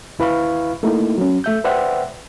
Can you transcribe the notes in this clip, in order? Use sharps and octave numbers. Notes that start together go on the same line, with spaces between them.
D#2 E4 B4 F5 B5 C#6
A3 A#3 D#4 E4
F#3 C#4
A3 E5 G6
B4 C5 D5 E5 F#5 G5